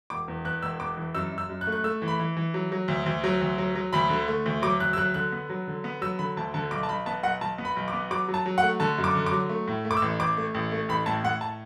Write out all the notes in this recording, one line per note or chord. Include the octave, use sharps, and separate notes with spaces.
E1 D6
E2
E2 F#6
E1 E6
E2 D6
E3
F#2 E6
F#2
E6
F#2
F#6
A3
F#6
A3 E6
E3
B5
E3
E3
F#3
F#3
D2
D2
F#3
D2
F#3
F#3
D2 B5
D3
A3
D2
F#3 D6
D2 F#6
E6
F#3 F#6
D3 F#6
B3
F#3
D3
B3
F#3 E6
D3 B5
D2 A5
D3 A5
B1 D6
A5
B1 B5
B3 A5
B1 F#5
B1 A5
B3
B5
B1
D6
B3
F#3 D6
F#3
A5
F#3
F#5
A3
D3 A5
F#2
D6
D3
D6
F#3
A3
A2
A3
D6
E6
A1
A1 D6
A3
A1
A3
A1 B5
A2 A5
A2 F#5
A5